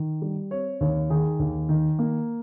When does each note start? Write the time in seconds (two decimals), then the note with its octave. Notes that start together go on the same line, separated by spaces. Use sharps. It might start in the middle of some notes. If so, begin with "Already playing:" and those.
Already playing: D#3
0.22 G3
0.51 C4 C#5
0.81 D#2 C#5
1.10 D#3 G#4
1.40 D#2
1.69 D#3
1.99 A#3